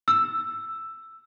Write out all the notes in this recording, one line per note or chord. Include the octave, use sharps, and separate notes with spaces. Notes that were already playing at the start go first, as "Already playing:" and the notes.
E6